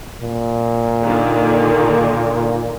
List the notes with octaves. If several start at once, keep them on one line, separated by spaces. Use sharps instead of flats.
A#2
D3 D#3 A#3